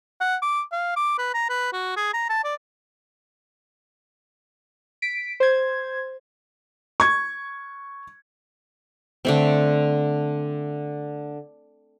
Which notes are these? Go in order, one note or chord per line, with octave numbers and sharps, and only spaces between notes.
F#5
D6
F5
D6
B4
A#5
B4
F#4
G#4
A#5
A5
D5
B6 D7
C5 G#6
C#6 G#6
D3 A3 C4